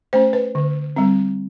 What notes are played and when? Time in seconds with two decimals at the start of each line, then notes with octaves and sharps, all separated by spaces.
0.13 A3 C#4 C5
0.33 B4
0.55 D3
0.96 G3 C4